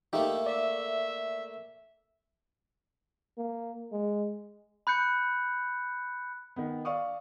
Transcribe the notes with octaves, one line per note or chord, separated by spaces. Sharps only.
A3 A#3 D#4 G4 G5
D5 E5
A#3
G#3
B5 F#6 G6 C#7
D#3 B3
D5 F5 C#6 D#6